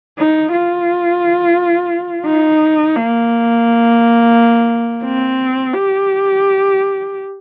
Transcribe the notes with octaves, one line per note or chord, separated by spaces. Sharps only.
D#4
F4
D#4
A#3
C4
G4